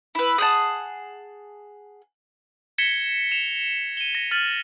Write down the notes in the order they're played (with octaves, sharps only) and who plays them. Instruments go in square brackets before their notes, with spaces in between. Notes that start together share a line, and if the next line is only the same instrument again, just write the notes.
[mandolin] E4 B4
G#4 F#5 G5 A5
[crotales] G#6 A#6 B6 C#7 E7 G7
E7 F7
D#7 G7
A#6
F6 A6 D#7 F#7